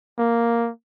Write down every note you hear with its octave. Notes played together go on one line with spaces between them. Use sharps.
A#3